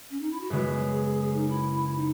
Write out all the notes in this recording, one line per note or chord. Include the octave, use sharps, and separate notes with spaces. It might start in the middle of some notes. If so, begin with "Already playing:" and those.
C#4
D#4
E4
F#4
F#2 C#3 G#3 B3 G#4
D#4
E4
D#4